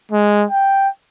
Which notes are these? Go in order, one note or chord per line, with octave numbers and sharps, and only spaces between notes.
G#3
G5